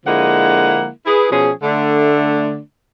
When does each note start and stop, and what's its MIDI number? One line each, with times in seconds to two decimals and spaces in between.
0.06 0.88 50
0.06 0.88 53
0.06 0.88 56
0.06 0.88 58
0.06 0.88 64
0.06 0.88 78
1.06 1.31 64
1.06 1.31 68
1.06 1.31 71
1.31 1.51 47
1.31 1.51 53
1.31 1.51 61
1.31 1.51 68
1.62 2.59 50
1.62 2.59 57
1.62 2.59 62